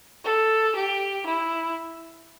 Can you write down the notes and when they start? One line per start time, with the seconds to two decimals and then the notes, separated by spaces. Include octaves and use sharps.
0.24 A4
0.75 G4
1.25 E4